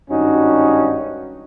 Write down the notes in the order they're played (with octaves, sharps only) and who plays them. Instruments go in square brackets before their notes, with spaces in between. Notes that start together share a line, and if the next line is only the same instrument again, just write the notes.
[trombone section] G#1 G2 C#4 D#4 F#4